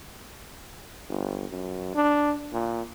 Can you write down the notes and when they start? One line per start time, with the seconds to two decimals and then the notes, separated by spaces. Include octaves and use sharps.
1.09 G1
1.50 F#2
1.95 D4
2.53 A#2